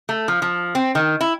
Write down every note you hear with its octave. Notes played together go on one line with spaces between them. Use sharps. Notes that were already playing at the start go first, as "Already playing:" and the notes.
A3
F3
F3
C4
D#3
E4